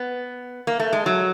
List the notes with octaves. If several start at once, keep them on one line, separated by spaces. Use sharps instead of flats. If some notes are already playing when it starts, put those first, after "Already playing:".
Already playing: B3
A#3
A3
G#3
F#3